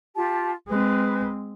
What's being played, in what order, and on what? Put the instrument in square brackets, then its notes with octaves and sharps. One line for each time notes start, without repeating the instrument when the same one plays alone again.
[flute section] F4 G4 A5
[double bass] G#3 C4 [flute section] B4